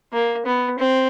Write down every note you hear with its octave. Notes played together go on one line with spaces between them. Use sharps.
A#3
B3
C4